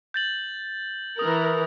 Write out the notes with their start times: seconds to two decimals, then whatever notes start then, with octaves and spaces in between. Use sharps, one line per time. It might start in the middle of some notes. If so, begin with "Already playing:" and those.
0.14 G6 A6 F#7
1.19 E3 A#4 D#6